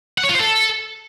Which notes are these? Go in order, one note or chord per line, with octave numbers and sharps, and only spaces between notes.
F#5
C#5
F4
C5
A4